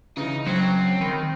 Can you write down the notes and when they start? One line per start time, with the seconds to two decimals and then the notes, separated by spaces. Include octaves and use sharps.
0.17 C#3 E3 D#4
0.46 F#3 C4
1.01 D#3 B5